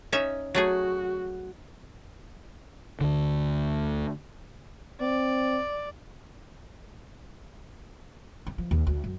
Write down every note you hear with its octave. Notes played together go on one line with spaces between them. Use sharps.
C#4 D#4 E5
F#3 A3 F#4 G#4
D2 D3
C4 D5
C4
F3
D#2
D2
F#2